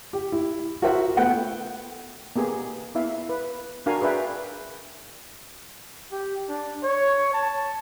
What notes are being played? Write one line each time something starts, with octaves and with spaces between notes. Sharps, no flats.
G4
E4
F#4 A#4 C5 E5 F#5
A3 B3 F#5 G5
A#3 B3 G4 G#4
B3 E4 E5 F5
B4
D4 F#4 A#4 F5 G#5
G#4 B4 D5 E5 G5
G4
D4
C#5
A5